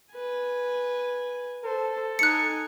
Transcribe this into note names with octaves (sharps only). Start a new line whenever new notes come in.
B4 G#5
A4 C5
D#4 G#5 F#6 C#7